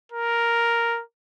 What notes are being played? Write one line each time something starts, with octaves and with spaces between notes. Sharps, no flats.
A#4